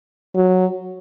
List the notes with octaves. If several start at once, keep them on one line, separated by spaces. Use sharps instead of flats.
F#3